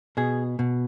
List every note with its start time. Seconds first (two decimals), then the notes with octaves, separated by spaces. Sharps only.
0.17 B2 G#4
0.59 B2